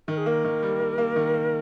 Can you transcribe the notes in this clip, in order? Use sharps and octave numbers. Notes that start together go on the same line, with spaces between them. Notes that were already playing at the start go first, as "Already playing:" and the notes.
D#3 A#4
G#4
A#3 A#4
D#3
G3
A#3
A#3
D#3
A#3